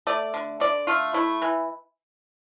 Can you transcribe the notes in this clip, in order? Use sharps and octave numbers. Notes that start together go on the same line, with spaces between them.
A3 D5
D3
D3 D5
A3 F4
A3 E4
E3